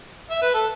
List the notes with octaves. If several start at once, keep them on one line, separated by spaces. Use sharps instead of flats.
E5
B4
A4